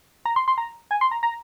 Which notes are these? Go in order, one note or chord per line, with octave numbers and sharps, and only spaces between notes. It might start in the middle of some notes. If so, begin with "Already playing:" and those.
A#5
C6
C6
A#5
G#5
C6
A#5
A#5